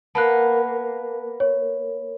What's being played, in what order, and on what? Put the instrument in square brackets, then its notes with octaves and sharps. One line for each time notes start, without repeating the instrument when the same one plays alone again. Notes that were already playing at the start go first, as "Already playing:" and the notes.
[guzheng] A#3 B3 [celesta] A5 F#6
[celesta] C#5